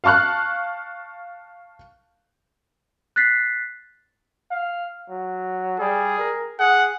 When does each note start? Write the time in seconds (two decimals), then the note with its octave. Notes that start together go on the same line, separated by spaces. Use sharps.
0.04 F5 A5 C#6 F6 F#6
3.16 F#6 A6 B6 C7
4.51 F5
5.09 F#3
5.80 G3 G#4
6.19 A#4
6.59 G#4 F#5